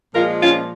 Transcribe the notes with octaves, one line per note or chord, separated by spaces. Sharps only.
A#2 F3 G#3 F4 A#4
C#4 F4